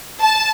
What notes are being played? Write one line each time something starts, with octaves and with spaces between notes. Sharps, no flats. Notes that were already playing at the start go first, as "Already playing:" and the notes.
A5